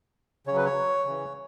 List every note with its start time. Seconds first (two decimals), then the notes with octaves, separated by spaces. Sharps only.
0.47 C#3 F#3 C#5
0.56 B4
0.65 C#5
1.05 C#3 E3